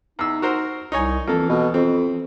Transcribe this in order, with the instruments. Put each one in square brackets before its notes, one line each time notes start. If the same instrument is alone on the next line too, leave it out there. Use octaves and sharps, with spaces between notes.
[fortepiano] E2 E6 [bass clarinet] D#4
[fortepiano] F#4 A#4 C5
[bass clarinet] C2 [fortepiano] D#4 C#5 G#5
[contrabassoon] F2 [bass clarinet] E3 [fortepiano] A#3 A4
[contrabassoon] B2
[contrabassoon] F2 [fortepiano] C4